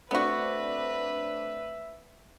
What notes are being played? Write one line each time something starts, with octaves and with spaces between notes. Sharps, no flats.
A3 B3 C4 D4 F#4 B4 E5